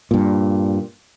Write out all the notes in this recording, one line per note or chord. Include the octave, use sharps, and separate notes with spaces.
G2 A#2